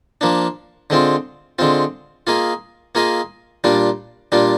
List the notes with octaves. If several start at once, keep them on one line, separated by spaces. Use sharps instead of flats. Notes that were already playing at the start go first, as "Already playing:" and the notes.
F3 A#3 D4
D3 G#3 C4 F4
D3 G#3 C4 F4
A#3 F4 G#4 D#5
A#3 F4 G#4 D#5
A#2 G3 D4 F4
A#2 G3 D4 F4